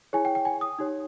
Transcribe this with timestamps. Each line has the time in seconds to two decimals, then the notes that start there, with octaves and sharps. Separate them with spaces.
0.13 E4 G#4 C#5 G#5
0.25 G5
0.35 G5
0.45 G#5
0.61 D#6
0.79 D#4 G4 C#5